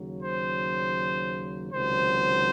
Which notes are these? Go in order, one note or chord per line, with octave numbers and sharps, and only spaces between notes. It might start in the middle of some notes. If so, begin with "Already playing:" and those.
Already playing: D#2 C#3 F#3
C5
C#2 C3 D#3 F#3 C5